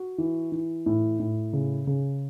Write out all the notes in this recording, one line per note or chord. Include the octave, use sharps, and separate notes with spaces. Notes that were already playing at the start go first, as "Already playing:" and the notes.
Already playing: F#4
E3
E3
A2
A2
C#3
C#3